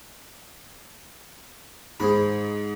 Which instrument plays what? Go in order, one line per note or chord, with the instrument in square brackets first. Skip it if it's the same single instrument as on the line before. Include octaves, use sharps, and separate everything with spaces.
[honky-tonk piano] G#2 [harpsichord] G#4 C5 B5